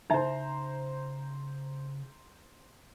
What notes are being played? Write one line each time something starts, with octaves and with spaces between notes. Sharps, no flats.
C#3 D#4 C5 E5 A#5